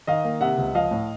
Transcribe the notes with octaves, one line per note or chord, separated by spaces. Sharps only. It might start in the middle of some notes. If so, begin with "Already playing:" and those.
D#3 D#5 F5
A#3
C3 E5 F#5
C#2
F3 D#5 F5
A2